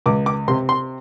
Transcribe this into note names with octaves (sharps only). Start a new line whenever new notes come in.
C#2 D6
D6
C3 C6
C6